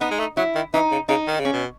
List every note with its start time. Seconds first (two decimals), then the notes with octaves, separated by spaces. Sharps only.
0.01 B3 D#4
0.11 G#3
0.19 A3
0.37 F#3 E4
0.55 D#3
0.74 E3 D#4
0.91 C#3
1.09 C#3 D#4
1.27 D#3
1.40 C#3
1.45 C#4
1.53 B2